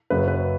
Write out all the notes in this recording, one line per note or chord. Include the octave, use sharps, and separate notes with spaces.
F#1 F#2 C#3 F#3 B4
B4